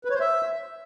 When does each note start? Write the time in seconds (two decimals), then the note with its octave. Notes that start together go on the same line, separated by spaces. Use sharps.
0.05 B4
0.10 C#5
0.15 C5
0.21 E5